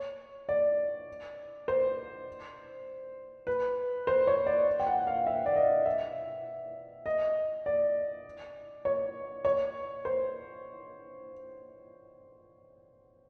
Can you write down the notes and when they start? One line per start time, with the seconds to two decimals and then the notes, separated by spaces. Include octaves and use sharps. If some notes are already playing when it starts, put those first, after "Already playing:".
Already playing: C#5
0.49 D5
1.68 C5
3.47 B4
4.07 C5
4.27 C#5
4.47 D5
4.79 G5
4.87 F#5
5.07 F5
5.27 E5
5.46 D5
5.56 D#5
5.86 E5
7.06 D#5
7.66 D5
8.85 C#5
9.45 C#5
10.05 C5